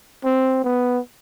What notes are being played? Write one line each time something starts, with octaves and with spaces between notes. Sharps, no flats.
C4
B3